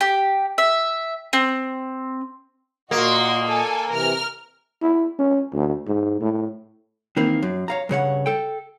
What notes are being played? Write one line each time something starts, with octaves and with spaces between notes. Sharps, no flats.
G4
E5
C4
A#2 A#3 F#4 D#5 C6
A4 G#5
C3 E3 A#4 F6
E4
C#4
D2
G#2
A2
D#3 E3 A#3 C4
F#2
C#5 F5 A#5
G2 C#3 C#5 F#5
A4 G5